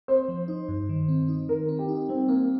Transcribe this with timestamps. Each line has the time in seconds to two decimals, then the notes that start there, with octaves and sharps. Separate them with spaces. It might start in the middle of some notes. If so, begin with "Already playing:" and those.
0.08 C4 C5
0.28 F3
0.48 D#4
0.68 G2
0.89 D#3
1.08 C4
1.28 D#4
1.49 D#3 A#4
1.69 C4
1.79 G4
1.89 D#4
2.09 G3 C4
2.28 A#3 C4